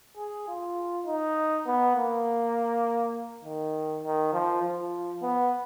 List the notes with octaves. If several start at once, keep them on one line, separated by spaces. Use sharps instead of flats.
G#4
F4
D#4
B3
A#3
D#3
D#3
F3
F3
B3